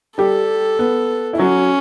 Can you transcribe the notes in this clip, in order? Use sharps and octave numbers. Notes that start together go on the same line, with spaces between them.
G3 G4 A4
B3
E4
F#3 C#4 F#4